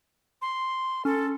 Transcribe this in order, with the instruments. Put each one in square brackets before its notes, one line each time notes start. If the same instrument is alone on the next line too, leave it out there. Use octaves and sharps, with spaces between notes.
[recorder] C6
[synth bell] C#4 [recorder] A4